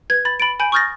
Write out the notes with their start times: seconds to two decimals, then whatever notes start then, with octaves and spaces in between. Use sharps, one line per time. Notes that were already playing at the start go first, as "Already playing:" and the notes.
0.10 B4 G#6
0.25 B5 A6
0.40 B5 A6 D7
0.60 G#5 B5 G6 D7
0.72 C#6 D#6 F6 G6 A6 A#6